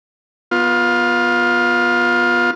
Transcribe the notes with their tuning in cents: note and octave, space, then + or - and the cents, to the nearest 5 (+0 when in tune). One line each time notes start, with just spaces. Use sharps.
B3 -20 F4 +15